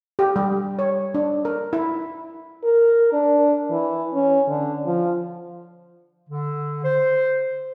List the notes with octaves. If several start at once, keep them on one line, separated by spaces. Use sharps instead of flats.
G4
G3
C#5
D4
A#4
E4
A#4
D4
E3
C#4
D3
F3
D3
C5